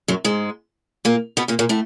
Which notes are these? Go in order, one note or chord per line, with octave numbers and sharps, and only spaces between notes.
F#2 F#3
G#2 G#3
A#2 A#3
B2 B3
A#2 A#3
A#2 A#3
A2 A3